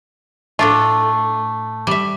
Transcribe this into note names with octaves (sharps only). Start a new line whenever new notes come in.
A2 A3 D4 F4
G3 E5